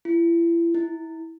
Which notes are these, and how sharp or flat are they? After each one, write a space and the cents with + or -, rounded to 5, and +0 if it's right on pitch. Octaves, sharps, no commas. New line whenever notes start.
E4 +35
E4 -20